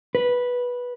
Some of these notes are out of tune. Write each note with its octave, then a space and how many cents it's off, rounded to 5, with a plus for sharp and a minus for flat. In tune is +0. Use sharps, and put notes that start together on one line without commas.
B4 -10